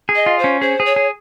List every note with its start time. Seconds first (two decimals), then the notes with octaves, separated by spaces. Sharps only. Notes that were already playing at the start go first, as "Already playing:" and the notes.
0.09 G#4
0.15 D#5
0.26 F4
0.39 C5
0.44 C#4
0.61 G#4 C5
0.80 G#4
0.86 C#5
0.96 G#4